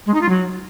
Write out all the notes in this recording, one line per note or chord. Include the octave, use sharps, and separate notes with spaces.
G#3
D#4
F4
F#3